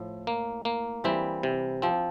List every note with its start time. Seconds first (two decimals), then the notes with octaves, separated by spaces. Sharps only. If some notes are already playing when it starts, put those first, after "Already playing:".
Already playing: A2 F3
0.27 A#3
0.65 A#3
1.04 E3 G3 C4
1.43 C3
1.82 F3 C4